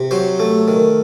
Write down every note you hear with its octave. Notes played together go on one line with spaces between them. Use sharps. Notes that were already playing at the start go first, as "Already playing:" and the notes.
Already playing: C3
F#3 C5
A3
D#3